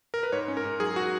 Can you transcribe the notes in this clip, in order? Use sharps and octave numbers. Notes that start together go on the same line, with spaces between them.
A#4
B4
G#2 C#5
C#4
A#4
G#2
F#3 G#4
F#4